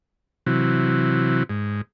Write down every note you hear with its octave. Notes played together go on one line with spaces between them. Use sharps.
C3 E3 F#3
G#2